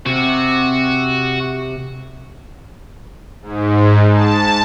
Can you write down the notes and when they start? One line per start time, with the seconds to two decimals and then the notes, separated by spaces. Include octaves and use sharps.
0.06 C3 F#4
3.42 G#2
4.13 A5